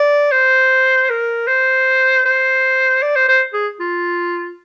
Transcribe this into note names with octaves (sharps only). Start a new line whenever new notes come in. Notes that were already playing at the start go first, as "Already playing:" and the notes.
Already playing: D5
C5
A#4
C5
C5
D5
C5
C5
G#4
F4